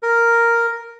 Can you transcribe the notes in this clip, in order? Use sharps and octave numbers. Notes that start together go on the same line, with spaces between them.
A#4